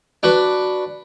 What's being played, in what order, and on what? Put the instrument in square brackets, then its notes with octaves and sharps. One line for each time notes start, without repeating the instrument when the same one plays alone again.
[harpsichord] D4 F#4 B4